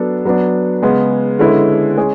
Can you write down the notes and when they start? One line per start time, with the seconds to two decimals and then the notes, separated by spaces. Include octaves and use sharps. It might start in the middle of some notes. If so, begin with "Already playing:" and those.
Already playing: F#3 B3 D4 A4
0.25 F#3 B3 D4
0.82 C#3 G#3 B3
1.39 D3 G#3 C#4 E4 B4
1.97 G#3 C#4 G#4